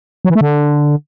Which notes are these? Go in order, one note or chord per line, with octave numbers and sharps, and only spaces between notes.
F#3
E3
A3
D3